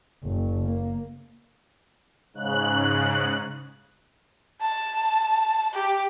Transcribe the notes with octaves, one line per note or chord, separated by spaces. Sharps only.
F#1
A#3
G#2 C#3 F#6
A5
G4